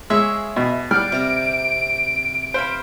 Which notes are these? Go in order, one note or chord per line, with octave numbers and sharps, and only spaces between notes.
G#3 G#4 C#5 E5 F5
B2
G3 D5 F5 F#5 F6 D7
C3 A#5
B4 C5 F5 B5